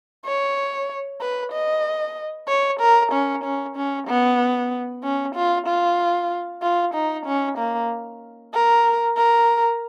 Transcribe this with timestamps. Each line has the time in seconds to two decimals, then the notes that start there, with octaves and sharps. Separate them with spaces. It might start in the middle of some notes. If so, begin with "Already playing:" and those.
0.26 C#5
1.21 B4
1.53 D#5
2.48 C#5
2.80 A#4
3.12 C#4
3.44 C#4
3.76 C#4
4.08 B3
5.03 C#4
5.35 F4
5.67 F4
6.62 F4
6.94 D#4
7.26 C#4
7.58 A#3
8.53 A#4
9.17 A#4